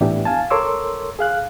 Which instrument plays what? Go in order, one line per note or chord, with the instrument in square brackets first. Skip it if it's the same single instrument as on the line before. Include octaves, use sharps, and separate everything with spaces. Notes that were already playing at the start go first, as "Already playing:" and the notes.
[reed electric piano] A2 E3 B3 D4 E4 G4
F5 G#5 A5
A4 A#4 C#5 C6 D6 E6
G#4 F5 F#6